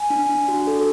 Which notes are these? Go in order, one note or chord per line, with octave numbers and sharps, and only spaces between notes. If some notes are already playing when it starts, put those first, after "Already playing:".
Already playing: G#5
D4
D4
F#4
A4